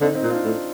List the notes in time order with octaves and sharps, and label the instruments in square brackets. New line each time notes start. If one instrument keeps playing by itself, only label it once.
[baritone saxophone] D3 [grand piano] C4 D#4
[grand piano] C4 D#4
[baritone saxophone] A#2
[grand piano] D4 F4
[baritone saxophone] A2